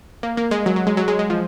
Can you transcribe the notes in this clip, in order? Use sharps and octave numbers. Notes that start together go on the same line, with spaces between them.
A#3
A#3
G#3
F#3
F#3
G#3
F#3
G#3
G#3
F3